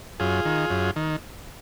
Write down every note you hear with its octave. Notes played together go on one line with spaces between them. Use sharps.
F#2 F4 G#4
D#3
F#2
D#3